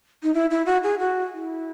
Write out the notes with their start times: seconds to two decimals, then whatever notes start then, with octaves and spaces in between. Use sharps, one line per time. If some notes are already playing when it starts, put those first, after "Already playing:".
0.23 D#4
0.34 E4
0.51 E4
0.66 F#4
0.83 G#4
0.99 F#4
1.33 E4